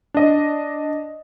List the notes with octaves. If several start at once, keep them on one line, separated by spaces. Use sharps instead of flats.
D4 D#5